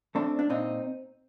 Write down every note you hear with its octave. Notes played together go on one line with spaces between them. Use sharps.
A3 C4 D4
D4
A#2 C4 D#4